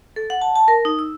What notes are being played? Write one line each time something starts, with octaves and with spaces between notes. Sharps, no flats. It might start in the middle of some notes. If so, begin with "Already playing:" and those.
A4
F#5
A5
A5
A#4
D#4
E6